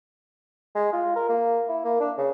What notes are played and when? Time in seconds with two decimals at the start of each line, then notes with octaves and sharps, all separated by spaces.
0.75 G#3
0.92 F4
1.16 A#4
1.29 A#3
1.68 E4
1.84 A#3
2.00 D4
2.17 C#3